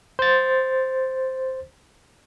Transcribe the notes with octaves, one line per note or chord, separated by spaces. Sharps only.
C5 A6